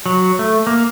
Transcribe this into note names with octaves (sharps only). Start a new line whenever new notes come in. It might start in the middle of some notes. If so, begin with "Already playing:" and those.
F#3
A3
A#3